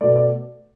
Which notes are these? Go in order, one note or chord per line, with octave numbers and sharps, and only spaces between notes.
B2 A3 D5
D5